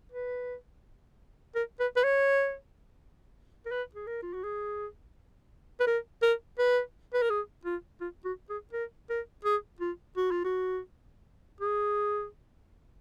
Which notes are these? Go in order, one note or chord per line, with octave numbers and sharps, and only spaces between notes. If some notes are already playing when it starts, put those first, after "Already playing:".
B4
A#4
B4
B4
C#5
A#4
B4
G#4
A#4
F4
F#4
G#4
B4
A#4
A#4
B4
B4
A#4
G#4
F4
F4
F#4
G#4
A#4
A#4
G#4
F4
F#4
F4
F#4
G#4